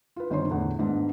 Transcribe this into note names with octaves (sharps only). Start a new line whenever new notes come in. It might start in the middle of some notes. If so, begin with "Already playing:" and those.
F4 B4
G1 D#3 C4 C#5 C6
E2 A2 D3 A3 F#5
G#2 D#3 B3 D4 D#4